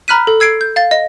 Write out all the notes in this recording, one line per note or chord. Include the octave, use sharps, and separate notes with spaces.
A#5 B5 F6 F#6 B6 D#7
A4
E6 G#6 C7 D7
G6
F5 A6
D#5